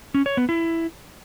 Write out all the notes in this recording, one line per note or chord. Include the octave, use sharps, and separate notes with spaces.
C#4
C#5
B3
E4